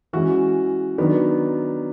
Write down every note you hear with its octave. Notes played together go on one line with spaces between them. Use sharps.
E3 G#3 C#4 F#4
D#3 F#3 B3 D4